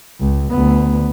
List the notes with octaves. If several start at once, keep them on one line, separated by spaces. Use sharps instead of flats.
C#2
D2 B3